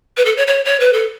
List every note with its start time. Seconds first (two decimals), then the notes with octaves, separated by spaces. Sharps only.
0.17 B4
0.25 A4
0.37 C#5
0.47 C#5
0.65 C#5
0.80 B4
0.93 A4